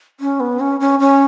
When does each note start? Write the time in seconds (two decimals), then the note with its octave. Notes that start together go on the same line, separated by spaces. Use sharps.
0.20 C#4
0.40 B3
0.60 C#4
0.80 C#4
1.00 C#4